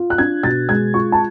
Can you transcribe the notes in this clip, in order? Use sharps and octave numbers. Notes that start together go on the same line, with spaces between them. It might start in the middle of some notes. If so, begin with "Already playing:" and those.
Already playing: F4
F#6
D4 G#6
B2 A6
G#3 G#6
F4 C#6
A5